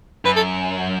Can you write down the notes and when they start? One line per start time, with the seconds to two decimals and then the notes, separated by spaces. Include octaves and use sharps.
0.25 F#2 B4
0.36 A4